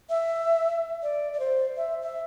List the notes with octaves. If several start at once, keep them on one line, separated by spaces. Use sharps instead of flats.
E5
D5
D5
C5
E5
E5